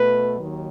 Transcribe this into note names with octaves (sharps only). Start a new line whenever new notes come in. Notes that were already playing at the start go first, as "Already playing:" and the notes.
Already playing: B2 A3 B4
D#2 D#3 F#3